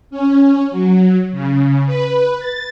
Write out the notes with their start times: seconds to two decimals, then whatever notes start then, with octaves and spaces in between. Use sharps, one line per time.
0.11 C#4
0.71 F#3
1.32 C#3
1.86 B4
2.39 A6